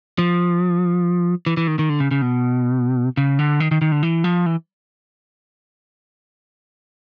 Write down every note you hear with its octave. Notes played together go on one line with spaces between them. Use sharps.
F3
E3
E3
D#3
D#3
D3
C#3
C#3
B2
C#3
D3
D#3
D#3
D#3
D3
E3
F3
E3